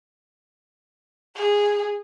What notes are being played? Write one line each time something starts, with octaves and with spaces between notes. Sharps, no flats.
G#4